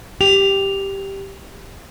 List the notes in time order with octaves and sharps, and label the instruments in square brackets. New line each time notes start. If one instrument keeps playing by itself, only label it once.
[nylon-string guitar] G4 [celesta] F7